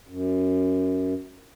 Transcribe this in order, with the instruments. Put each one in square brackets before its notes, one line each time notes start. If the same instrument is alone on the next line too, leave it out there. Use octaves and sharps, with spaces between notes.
[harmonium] F#2